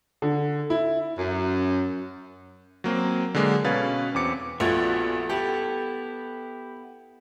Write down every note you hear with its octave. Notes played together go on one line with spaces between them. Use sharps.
D3
E4
F#2
F#3 A#3 C4
D3 F#3 G#3 A#3
B2 C#4 B4 F5 G#6 A6
E2 C4 D6 C#7
A#1 A3 B3 F4 F#4 G#5
B3 E4 G4 A4